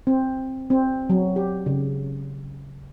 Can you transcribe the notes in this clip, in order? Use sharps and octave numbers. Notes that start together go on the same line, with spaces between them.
C4
C4
F#3
G4
C#3